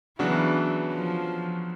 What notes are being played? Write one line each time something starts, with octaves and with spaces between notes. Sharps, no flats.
C#3 E3 F#3 B3 D4 F#4
F3